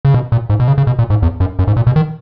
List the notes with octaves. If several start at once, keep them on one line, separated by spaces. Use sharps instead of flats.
C#3
B2
A#2
G#2
B2
C#3
C#3
B2
A#2
G#2
E2
F#2
F#2
G#2
A#2
B2
D#3